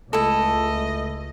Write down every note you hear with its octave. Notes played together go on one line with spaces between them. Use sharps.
C#2 A3 E4 A4 D#5